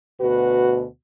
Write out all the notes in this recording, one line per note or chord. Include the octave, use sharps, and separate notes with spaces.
D2 B2 F#4 B4